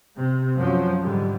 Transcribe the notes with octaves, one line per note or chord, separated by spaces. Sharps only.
C3
F#2 F3 F#3 C#4
G#2 D3 G3